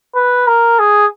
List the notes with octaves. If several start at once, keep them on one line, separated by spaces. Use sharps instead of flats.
B4
A#4
G#4